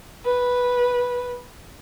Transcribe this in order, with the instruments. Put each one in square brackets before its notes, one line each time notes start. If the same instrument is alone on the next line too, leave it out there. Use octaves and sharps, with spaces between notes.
[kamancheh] B4